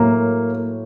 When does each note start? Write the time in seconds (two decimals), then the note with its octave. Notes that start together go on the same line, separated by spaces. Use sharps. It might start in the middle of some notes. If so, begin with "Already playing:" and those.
Already playing: A2 F#3 A#3